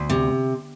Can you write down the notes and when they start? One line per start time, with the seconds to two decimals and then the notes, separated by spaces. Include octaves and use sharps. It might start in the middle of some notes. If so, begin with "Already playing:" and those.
Already playing: D2
0.09 C3